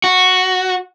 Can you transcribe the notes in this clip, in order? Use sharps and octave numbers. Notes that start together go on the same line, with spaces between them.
F#4